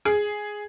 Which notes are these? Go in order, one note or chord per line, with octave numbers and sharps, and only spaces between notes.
G#4